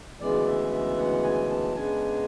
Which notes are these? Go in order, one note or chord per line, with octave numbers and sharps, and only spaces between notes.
D2 C#3 E3 G#3 B3 D5
E5
E5
F#5
G#5
A5
C#3 G#3 B3 D4 G#5